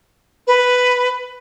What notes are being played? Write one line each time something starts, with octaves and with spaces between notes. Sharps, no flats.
B4